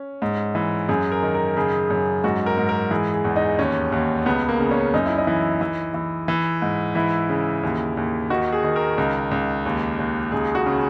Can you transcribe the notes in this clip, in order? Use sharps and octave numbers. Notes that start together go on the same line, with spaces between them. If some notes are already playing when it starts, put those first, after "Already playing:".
Already playing: C#4
G#2
E3
F#2 G#4
A#4
D#3
A#4
C#3 G#4
F#2
G#2 F#4
A#4
G#2
A#4
E3 G#4
G#4
E2
D#4
D#2 C#4
D#2
C#2 B3
A#3
C#3
C#4
F#2 D#4
E4
D#4
E3
E3
E3
E3
G#2
E3 E4
C#3
D#2
D#2
D#3 F#4
G#4
D#3
A#4
C#2
C#2
D#2
D#2
C#2 G#4
F#4
C#3